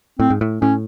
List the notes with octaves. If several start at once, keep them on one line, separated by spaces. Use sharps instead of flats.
A2 C4
G#2
A2
A2 C#4